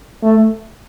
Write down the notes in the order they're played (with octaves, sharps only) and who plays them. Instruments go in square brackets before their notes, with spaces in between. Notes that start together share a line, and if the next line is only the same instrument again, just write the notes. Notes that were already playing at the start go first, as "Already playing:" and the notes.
[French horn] A3